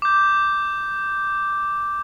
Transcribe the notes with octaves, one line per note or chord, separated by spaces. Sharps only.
D6 G6